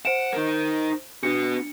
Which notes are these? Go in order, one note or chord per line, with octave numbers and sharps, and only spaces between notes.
C5 F#5 D7 E7
D#4 A#4
B3 D4 F#4 C#7